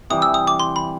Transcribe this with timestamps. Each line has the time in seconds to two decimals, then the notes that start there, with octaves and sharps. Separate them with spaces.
0.10 C3 E3 G3 D#6
0.22 E6
0.34 D#6
0.47 D6
0.60 C6
0.76 B5